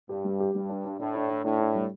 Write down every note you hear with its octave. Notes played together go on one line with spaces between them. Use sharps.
G2 G4
G3
G4
G2 G3
D4
D4
A2 D4
D4
D4
A2 D4
D4
G3